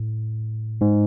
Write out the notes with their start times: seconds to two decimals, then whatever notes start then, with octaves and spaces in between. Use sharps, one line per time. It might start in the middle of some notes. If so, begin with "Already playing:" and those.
Already playing: A2
0.81 G#2